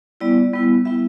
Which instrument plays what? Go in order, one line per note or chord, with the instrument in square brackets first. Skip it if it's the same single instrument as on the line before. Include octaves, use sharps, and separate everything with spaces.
[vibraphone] G3 B3 E4 D5
G3 B3 E4
G3 B3 E4 E5